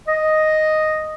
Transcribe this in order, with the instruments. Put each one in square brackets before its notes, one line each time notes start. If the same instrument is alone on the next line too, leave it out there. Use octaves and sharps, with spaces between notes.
[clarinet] D#5